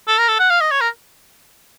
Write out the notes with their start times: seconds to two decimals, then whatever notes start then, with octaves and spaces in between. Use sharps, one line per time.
0.08 A4
0.18 A#4
0.28 A4
0.39 F#5
0.50 F5
0.61 D#5
0.72 C#5
0.81 A#4